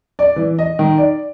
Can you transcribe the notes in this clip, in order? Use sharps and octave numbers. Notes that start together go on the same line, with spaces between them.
D5
E3
D#5
D#3
D5